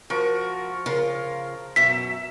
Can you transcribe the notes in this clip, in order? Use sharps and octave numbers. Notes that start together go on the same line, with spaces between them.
F3 F#4 A#4 C#6
C#3 F4 A#4
F#2 B2 E5 B6